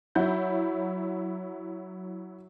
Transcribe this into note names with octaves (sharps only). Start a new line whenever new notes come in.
F#3 E4 F#5 G6